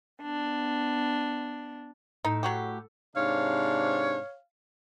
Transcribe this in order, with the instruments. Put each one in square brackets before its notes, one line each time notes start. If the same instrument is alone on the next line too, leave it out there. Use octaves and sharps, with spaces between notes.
[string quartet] B3 D4
[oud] A2 [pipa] D#4
[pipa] F#3 F#4 G4
[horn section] G#2 C3 D4 [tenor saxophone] C#5 [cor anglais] F5